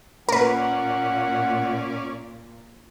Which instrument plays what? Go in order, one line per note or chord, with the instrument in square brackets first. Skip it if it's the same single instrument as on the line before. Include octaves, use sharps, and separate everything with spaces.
[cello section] A#2 [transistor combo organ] C#4 D5 [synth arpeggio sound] A#4 B4 [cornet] F#5